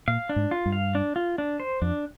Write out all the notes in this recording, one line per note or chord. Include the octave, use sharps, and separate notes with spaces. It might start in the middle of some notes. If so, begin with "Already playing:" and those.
A#2 F5
D4
G#2
F4
G2
F5
D4
F4
D4
C5
F2 D4